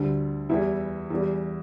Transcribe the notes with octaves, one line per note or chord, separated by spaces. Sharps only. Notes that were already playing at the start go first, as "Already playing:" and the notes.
Already playing: D2 D3 G3
E2 E3 G3 E4
E2 E3 G3